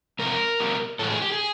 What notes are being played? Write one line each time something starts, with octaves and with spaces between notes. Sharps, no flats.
F2 C3 F3 G#3 A#4
B2 G3
A2 E3 G#3 A4
G#4
G4
G#4